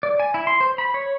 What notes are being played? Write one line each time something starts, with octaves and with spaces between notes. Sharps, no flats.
D5
G#5
E4
C6
C5
B5
C#5